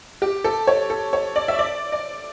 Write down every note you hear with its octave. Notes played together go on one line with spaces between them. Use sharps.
G4
A4
C#5
A4
C#5
D5
E5
D5
D5